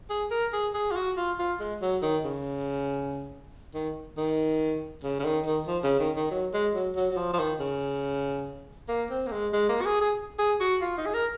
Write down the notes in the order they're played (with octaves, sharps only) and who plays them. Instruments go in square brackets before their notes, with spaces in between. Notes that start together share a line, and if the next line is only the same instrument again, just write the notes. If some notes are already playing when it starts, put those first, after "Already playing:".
[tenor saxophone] G#4
A#4
G#4
G#4
F4
F#4
F4
F4
G#3
F#3
D#3
C#3
D#3
D#3
C#3
C#3
D#3
D#3
F3
C#3
D#3
D#3
F#3
G#3
F#3
F#3
F#3
F3
F3
D#3
C#3
A#3
C4
A#3
G#3
G#3
A#3
F#4
G#4
G#4
G#4
F#4
F4
D#4
G#4
A#4